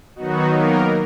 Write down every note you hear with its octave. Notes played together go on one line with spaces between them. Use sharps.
D#3 F#3 B3 D#4 F#4
A#3 A#4